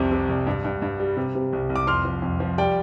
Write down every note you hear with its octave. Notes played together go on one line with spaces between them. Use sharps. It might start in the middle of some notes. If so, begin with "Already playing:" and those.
Already playing: C2 F2 C3
C3
C2
G2
G2
G2
G3
C3
C3
C2
C2
D6
F2 C6 F6
F3
F2
F3
G3 D5 G5